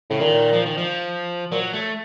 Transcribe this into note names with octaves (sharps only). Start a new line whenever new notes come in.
A2 C#3
A#2 D#3
F3
D#3
F3
A#2 F#3
A3